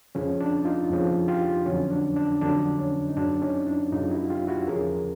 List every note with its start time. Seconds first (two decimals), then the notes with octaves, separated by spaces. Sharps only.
0.15 F2 C#3 F3 C#4
0.41 D4
0.65 D#4 F4
0.90 F2 C#3 F3
1.28 F4 G4
1.66 F2 D3 F#3 C#4
1.91 D4
2.16 D4
2.41 F2 D3 F#3 D4
2.79 C#4
3.09 D#4
3.16 F#2 C#3 F#3 D4
3.42 C#4 D#4
3.67 D4 E4
3.92 F#2 C#3 F#3 D#4 F4
4.11 E4 F#4
4.29 F4 G4
4.48 E4 F#4
4.67 E2 C#3 F3 G#4 A#4